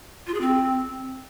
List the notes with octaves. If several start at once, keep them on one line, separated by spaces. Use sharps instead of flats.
F4
G#4
C4